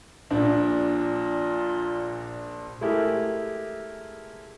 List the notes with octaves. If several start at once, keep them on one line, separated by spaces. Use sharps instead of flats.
A#1 A#2 D4
G#3 A3 E4 G4 G#4 A#4